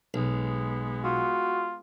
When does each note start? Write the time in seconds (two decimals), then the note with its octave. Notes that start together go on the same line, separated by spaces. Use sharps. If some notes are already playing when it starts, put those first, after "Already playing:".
0.14 B1 G#3 B3
1.04 F4 F#4